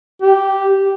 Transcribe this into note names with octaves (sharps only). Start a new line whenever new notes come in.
G4